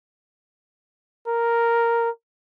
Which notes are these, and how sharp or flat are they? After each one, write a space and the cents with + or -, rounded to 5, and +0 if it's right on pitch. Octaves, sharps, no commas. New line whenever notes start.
A#4 +0